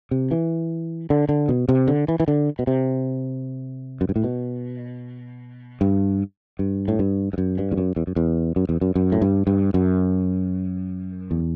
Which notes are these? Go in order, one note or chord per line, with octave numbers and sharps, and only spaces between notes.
C3
E3
D3
D3
B2
C3
D3
E3
E3
D3
B2
C3
F#2
G2
A2
B2
G2
G2
A2
G2
G2
F#2
G2
E2
F#2
E2
F#2
E2
F#2
E2
F#2
F#2
A2
G2
G2
F#2
E2